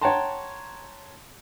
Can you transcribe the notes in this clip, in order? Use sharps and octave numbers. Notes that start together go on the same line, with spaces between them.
C#5 F#5 G5 A5 A#5 C6